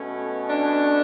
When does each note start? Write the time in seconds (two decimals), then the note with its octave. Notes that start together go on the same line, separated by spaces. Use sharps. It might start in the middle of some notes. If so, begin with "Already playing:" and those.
Already playing: B2 A3 C#4
0.49 D4